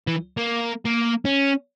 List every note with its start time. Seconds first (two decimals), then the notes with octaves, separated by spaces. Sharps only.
0.07 E3
0.37 A#3
0.85 A#3
1.25 C#4